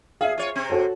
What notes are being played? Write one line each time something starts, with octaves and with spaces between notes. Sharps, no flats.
G#4 E5 F5
F4 C#5
C3 C4
F#4 A4 C#5